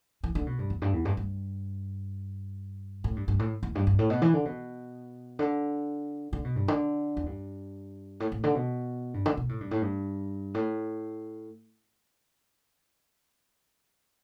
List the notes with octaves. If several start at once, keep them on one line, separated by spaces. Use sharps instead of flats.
E3
D3
B2
G2
E2
G2
E2
G2
G2
A2
G2
G2
A2
E2
G2
G2
A2
B2
E3
D3
B2
D3
D3
B2
G2
D3
E2
G2
A2
A2
D3
B2
G2
D3
B2
A2
G2
A2
G2
A2